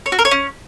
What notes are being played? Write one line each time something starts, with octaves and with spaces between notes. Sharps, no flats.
C#5
F#4
A#4
C#5
C#4